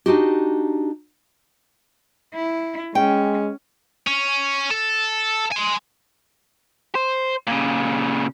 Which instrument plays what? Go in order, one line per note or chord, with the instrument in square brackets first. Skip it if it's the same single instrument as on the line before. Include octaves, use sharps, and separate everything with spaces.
[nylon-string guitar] D4 D#4 F#4 G4
[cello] E4
[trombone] G#3 [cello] C#4 [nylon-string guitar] G5
[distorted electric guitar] C#4
A4
G#5 C6
[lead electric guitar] C5
A#2 C#3